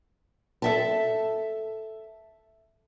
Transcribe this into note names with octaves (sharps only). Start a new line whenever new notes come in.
A4 E5 A5